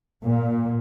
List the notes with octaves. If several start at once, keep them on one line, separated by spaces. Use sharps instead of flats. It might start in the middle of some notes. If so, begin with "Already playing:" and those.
A#2